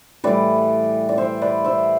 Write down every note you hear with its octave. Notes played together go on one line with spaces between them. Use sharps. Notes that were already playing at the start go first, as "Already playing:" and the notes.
A2 E3 G3 B4 D5
D5
C5 E5
B4 D5
C5 E5